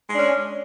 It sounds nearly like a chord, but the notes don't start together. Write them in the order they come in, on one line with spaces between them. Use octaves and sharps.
G#3 D4 C#4